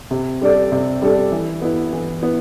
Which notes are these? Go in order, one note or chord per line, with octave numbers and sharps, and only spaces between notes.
C3
G3 D4 A4 D5
C3
G3 D4 A4 D5
E3
B3 E4
E3
B3 E4